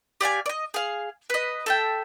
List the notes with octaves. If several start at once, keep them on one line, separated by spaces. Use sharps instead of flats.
G4 D5 F5 G#5
D5 D#5
G#4 F5
B4 D#5
A4 E5 G5